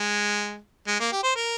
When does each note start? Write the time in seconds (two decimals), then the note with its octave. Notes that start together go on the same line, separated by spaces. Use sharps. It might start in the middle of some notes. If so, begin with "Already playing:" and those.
Already playing: G#3
0.88 G#3
1.00 A#3
1.12 G4
1.23 C5
1.36 A#4